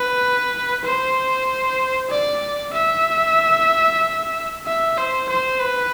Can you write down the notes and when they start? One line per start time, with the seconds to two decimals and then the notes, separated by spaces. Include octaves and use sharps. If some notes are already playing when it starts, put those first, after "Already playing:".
Already playing: B4
0.84 C5
2.10 D5
2.74 E5
4.66 E5
4.98 C5
5.29 C5
5.61 B4